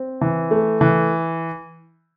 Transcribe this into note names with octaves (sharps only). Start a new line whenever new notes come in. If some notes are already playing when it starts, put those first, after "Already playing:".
Already playing: C4
E3
A3
E3